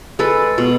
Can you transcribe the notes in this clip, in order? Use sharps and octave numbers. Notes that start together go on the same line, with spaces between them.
G#3 A4 B4
B2